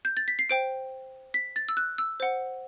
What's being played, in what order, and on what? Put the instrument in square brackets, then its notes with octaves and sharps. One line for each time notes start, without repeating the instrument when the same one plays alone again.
[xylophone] G6
A6
B6
C7
C5 G5 D7
B6
A6
E6
F#6
E6
C5 F#5